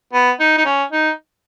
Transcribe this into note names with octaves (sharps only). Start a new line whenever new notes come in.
B3
D#4
D#4
C#4
D#4